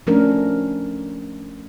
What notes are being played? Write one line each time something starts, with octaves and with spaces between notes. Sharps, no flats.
F3 A3 C#4 D4 A#4